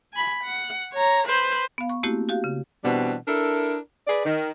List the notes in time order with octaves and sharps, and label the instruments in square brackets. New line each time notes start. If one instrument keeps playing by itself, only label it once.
[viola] G#5 B5
F#5
C#5 A#5
B4 C5
[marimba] B3 F5
C#6
A3 A#3 C4 E4 F#4 G4
F#4 G4 F5
C#3
[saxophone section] B2 E3 G3 C4 D4
D4 E4 A4 A#4
G#4 B4 D5
D#3